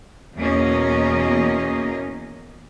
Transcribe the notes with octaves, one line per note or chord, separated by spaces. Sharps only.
E2 B2 A#3 C#4 A#4 D#5